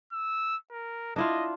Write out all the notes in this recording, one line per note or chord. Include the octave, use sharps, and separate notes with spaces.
E6
A#4
D4 E4 F4 D#5